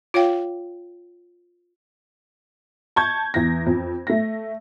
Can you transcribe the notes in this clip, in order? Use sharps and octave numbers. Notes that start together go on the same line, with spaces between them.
F4 C#5 F5 G5
A5 C#6 G6 G#6
E2 A#6
F2
A3 A#6